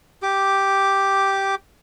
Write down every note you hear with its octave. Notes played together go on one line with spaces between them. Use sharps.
G4 D6